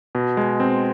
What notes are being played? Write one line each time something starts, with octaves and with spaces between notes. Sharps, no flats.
B2
G#3
C4